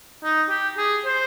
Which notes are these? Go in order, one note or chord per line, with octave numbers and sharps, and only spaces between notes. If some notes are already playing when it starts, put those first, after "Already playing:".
D#4
G4
G#4
C5